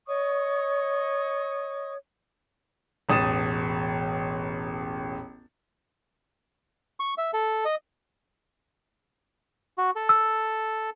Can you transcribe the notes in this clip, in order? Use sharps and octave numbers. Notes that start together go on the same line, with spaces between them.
C#5 D#5 C#6 D#6
E1 A1 D#6 A6 E7
C#6
E5
A4
D#5
F#4
A4
E6